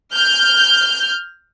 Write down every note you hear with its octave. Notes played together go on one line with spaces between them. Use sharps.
F6 G6